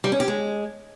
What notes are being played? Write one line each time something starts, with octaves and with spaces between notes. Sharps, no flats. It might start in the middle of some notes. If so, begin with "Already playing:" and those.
G3
C#4
G4
G#3